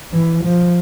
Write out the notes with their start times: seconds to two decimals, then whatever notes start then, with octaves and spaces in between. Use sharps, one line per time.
0.13 E3
0.44 F3